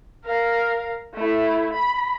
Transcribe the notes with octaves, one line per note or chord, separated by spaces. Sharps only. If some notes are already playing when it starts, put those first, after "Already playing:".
A#4 F5
A3 E4
B5